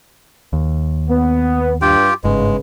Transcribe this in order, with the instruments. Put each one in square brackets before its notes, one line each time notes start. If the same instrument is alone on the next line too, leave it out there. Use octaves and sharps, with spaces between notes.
[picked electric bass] D#2
[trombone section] B3
[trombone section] G2 [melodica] F4 G4 G5
[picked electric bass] G1 G#2 [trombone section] C#3 B4 [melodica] G#3